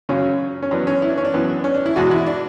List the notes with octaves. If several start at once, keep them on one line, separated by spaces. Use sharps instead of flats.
F#2 C#3 F#3 C#4
C#4
F#2 E3 B3 D4
C#4
E4
D4
C#4
D4
F#2 E3 B3
C#4
D4
E4
E2 B2 G#3 F#4
E4
D4